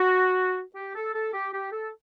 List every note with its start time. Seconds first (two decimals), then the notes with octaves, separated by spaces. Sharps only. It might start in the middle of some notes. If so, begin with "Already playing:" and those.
Already playing: F#4
0.76 G4
0.96 A4
1.15 A4
1.34 G4
1.54 G4
1.72 A4